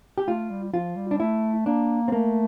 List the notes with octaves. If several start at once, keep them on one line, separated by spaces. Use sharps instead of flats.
G4
A3 F4
G3
F3 F4
G3
D4
A3 E4
A#3 D4
C4
A3 A#3